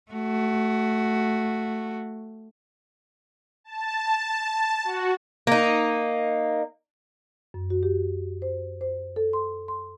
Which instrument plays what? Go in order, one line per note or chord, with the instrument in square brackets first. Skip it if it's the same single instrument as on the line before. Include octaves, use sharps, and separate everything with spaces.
[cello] A3 F#4
[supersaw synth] A5
F#4
[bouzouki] A#3 D#4
[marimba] F#2
F#4
G4
C5
C5
A4
C6
C6